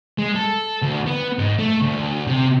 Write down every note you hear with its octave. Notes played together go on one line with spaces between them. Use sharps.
G#3
A4
D2
B3
G#2
A3
D2
C3